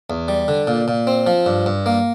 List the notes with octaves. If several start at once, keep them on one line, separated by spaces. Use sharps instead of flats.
E2
G3
D3
A#2
A#2
C4
F3
G2
G2
A#3